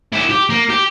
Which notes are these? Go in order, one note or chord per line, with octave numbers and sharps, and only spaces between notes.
E4 G4
G4
A#3
G4